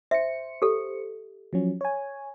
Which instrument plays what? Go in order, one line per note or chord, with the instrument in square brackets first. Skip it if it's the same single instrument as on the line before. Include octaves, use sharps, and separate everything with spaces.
[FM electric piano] C5 C#7 [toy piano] E5
[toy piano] G4 A4
[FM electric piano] F3 F#3 C#4
C#5 G#5